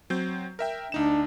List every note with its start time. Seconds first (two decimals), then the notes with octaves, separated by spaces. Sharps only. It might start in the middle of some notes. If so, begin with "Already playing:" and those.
0.10 F#3 C4 G6
0.59 A#4 E5 G5
0.92 D2 D4 D#4 E7